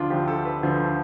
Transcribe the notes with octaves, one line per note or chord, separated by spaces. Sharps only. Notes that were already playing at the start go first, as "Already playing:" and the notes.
Already playing: D2 D3 F3 D4 F4
D2 D3 F3 G4
A4
B4
D2 D3 F3